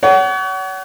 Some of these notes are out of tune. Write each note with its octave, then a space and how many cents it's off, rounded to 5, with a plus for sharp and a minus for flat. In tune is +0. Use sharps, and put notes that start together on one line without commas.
C#5 +35 F#5 +30